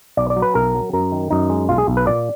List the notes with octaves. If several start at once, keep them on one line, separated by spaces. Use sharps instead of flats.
B1 D5
D5
F#3
B4
B1 A#4
F#3
F#2 A#4
D#3
F#2 D#4
G#3
B1 F4
G#4
B1
B4
A#2 D5